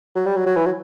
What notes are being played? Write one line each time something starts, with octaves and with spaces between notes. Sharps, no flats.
F#3
G3
F#3
F#3
E3
F#3